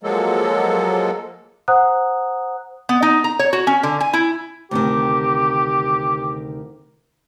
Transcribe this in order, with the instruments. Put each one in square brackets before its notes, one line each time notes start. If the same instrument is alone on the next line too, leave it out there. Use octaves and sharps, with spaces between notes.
[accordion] F3 F#3 G#3 A#3 A4
[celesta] C5 F#5 A#5 D#6 F#6
[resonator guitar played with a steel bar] B3
D#4
A#5
C#5
F#4
C#4
D3
G#5
E4
[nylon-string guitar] D2 C3 D#3 [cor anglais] G4